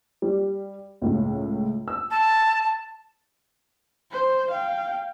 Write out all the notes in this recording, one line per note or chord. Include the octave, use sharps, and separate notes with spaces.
G3
C#2 A2
E6
A5
C5
F5 G5